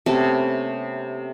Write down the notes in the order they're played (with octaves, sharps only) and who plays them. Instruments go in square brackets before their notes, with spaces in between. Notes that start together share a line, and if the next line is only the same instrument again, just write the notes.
[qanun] C3 A3 B3 C#4